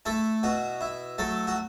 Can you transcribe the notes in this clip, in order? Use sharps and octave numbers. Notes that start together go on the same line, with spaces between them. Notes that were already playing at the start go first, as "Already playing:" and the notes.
A3 E4 A4
B2 F#4
E4
F#3 A3 A4
F#4